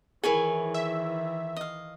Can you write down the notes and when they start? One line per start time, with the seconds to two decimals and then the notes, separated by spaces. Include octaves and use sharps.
0.24 D#3 E3 E4 G#4 A#4 C#5 G#5
0.74 E5
1.56 D#5 F5